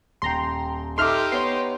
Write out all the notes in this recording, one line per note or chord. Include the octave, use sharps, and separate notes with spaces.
D#1 G5 A#5 C6
D#4 G4 A4 E5 C6 D6 F6
B3 C#5 C6